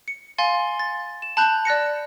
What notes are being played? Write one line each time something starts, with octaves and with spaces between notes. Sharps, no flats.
C#7
F5 G#5 C6 A6
A6
E7
A5 B5 F#6 G6 F7
D5 F#6 A#6 C#7